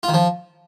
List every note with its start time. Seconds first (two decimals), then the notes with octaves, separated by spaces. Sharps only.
0.03 F4
0.09 D#3
0.14 F3